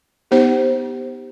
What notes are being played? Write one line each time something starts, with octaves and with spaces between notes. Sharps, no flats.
B3 D#4 G4 C5